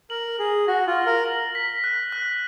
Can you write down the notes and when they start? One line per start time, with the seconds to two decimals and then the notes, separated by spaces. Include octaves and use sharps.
0.10 A#4 F#7
0.39 G#4 F6
0.68 F#4 A#6
0.87 F4
0.97 F6
1.06 A#4
1.25 F#7
1.55 B6
1.84 F#6
2.12 F#6